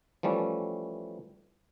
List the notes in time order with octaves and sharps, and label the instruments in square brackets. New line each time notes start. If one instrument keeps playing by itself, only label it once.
[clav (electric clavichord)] E3 F3 G3 A3 C#4